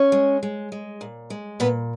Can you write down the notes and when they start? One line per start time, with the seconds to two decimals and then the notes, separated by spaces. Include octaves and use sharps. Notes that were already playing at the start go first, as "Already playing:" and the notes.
Already playing: C#4 C#5
0.12 G#3
0.43 G#3
0.72 G#3
1.01 A#2
1.30 G#3
1.60 A#2 B3 B4